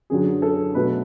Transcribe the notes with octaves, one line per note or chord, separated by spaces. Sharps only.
F#2 D3 F#3 G#4
A4
B2 F#3 A3 B4